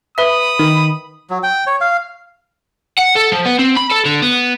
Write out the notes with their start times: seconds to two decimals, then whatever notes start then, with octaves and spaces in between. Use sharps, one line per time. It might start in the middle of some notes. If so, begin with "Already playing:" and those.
0.18 B4 E5 B5 D#6
0.59 D#3
1.30 F#3
1.43 G5
1.67 C#5
1.81 F5
2.99 F#5
3.16 A4
3.33 F3
3.46 B3
3.59 C4
3.77 B5
3.92 A4
4.06 D3
4.22 B3